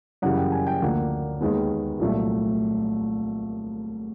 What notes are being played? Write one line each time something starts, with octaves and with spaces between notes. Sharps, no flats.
F#2 C#3 E3 G3 F#5
G5
G#5
G5
D2 D3 F3 A#3 F#5
D#2 D#3 G#3 B3
C2 A#2 F#3 A3